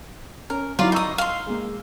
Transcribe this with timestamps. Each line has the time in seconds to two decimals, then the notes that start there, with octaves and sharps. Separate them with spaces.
0.50 C#4 A#4
0.79 F#3 E4 F4 D5 F5
0.92 D#4 A#5 C#6 D#6 E6
1.18 F5 C6
1.46 G#3 A#3